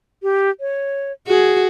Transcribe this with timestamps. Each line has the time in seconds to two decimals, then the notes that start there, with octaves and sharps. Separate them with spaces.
0.23 G4
0.60 C#5
1.27 F#4 G#4